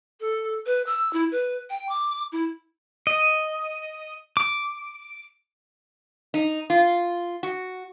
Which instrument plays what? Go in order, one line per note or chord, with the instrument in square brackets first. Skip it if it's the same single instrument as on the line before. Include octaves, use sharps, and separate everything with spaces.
[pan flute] A4
B4
E6
E4
B4
G5
D6
E4
[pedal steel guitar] D#5
D6
[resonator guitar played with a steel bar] D#4
F4
F#4